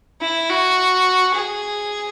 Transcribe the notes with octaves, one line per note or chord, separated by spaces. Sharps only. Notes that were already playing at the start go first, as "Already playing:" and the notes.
E4
F#4
G#4